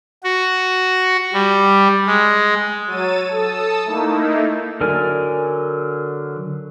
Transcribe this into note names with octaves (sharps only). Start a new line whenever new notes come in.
F#4
G3
G#3
F#3 C#5 E6 A6 D#7
A4 A5 D#6 E6
A3 A#3 D#4 E4
D3 F#3 A#4 D5 G#5